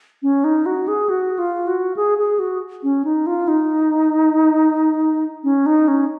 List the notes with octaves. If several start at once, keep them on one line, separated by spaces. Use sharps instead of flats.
C#4
D#4
F#4
G#4
F#4
F4
F#4
G#4
G#4
F#4
C#4
D#4
F4
D#4
C#4
D#4
C#4